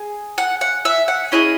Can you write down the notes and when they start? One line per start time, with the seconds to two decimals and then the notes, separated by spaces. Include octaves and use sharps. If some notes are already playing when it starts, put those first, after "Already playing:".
Already playing: G#4
0.38 F#5
0.61 F#5
0.85 E5
1.08 F#5
1.32 C#4 E4 G#4 D#5